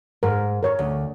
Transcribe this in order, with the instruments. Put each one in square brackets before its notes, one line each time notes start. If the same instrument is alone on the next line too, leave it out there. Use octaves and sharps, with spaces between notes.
[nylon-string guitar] G#2 [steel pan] A#4
[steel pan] A#4 C#5
[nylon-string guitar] D2